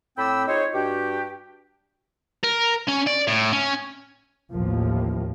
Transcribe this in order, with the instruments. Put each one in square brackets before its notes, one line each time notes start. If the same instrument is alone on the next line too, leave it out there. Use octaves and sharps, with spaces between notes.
[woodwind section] A2 C4 G5 B5 D6 E6
D#4 F4 G#4 C5 C#5
G2 D4 F#4 G4
[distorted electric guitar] A#4
C#4
D5
A2
C#4
[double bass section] A1 D#2 A2 F3 A#3